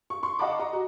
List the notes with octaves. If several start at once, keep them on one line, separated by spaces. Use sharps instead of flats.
C#6
C6 C#6
D#5 F5 F#5 A5 B5 D6
D#5 A#5
F#4